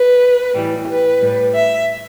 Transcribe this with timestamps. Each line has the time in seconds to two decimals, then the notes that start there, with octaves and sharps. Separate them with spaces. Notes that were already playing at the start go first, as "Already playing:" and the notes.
Already playing: B4
0.53 A2 E3 G3
0.87 B4
1.21 A2 G3
1.53 E5